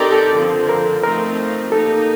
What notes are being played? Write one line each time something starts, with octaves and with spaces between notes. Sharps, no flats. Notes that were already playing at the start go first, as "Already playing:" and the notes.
Already playing: C4 D#4 G4 A4 A#4 D5
A4
D3 F3 C4
A#4
F3 A3 C4 D#4 A#4
A#3 D#4 G4 A4